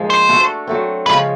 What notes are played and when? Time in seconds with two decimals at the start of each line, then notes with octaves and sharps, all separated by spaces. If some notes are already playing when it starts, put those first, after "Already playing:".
Already playing: G#2 F3 G#3 A#3 D4
0.10 C5
0.29 A3 D4 F#4 A4
0.67 F#3 A3 C4
1.06 C#3 F3 G#3 C#4 B4